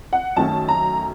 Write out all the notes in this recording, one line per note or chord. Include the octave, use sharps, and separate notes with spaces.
F#5
F#2 D#3 A3 C#4 A5
A#5